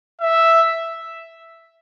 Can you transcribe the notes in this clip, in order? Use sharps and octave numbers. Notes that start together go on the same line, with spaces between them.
E5